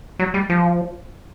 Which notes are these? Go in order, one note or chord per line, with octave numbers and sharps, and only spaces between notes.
F#3
G3
F3